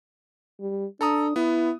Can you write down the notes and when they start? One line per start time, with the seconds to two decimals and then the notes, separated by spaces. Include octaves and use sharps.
0.60 G3
1.01 D4 A4 A#5 D#6
1.36 B3 E4